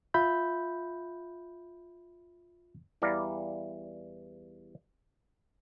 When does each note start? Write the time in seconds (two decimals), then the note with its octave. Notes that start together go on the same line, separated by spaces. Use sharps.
0.14 F4 E5 B5 G6
3.02 E2 E3 G3 D5 F5 A#5